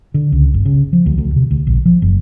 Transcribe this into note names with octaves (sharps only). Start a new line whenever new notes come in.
D3
C#2
G1
C#3
F3
D2
D2
C3
D2
A#1
F3
F#1